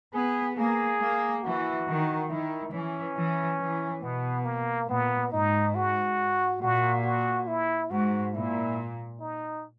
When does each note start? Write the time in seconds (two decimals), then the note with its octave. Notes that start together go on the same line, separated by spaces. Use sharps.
0.14 B3 G#4
0.57 A#3 G#4
1.01 A#3
1.43 E3 F#4
1.87 D#3
2.30 D#3 E4
2.72 E3 C#4
3.16 E3
3.59 E3
4.02 B2 B3
4.45 A#3
4.89 A#2 B3
5.32 G#2 D#4
5.75 F#4
6.61 A#2 F#4
7.04 F#4
7.48 E4
7.91 G#2 F#4
8.34 A#2 E4
9.20 D#4